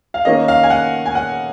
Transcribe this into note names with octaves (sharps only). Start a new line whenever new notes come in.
F5
D#3 A#3 C#4 D#5
F5
G#5
F#5
G#5
F#5